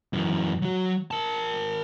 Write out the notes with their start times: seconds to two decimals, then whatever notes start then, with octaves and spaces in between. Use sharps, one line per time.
0.13 F#2 E3
0.62 F#3 F#4
1.11 A#4 A5